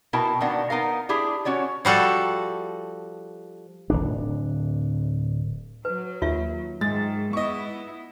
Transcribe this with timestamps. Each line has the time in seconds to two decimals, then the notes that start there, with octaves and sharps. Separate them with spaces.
0.13 B2 E4 A#4 G5 A5
0.41 B2 D#3 A#3 D4 F#5
0.70 B3 D#4 A#4 F5
1.09 D4 E4 G4 G#4
1.45 C#4 F#4 C#5 D5
1.85 F3 G3 F#4 A4
3.90 D1 G1 D4
5.85 F#3 B4
6.22 D#2 F4 E5
6.81 G#2 D#3 G#3 A6
7.33 B3 E4 D#5 C#6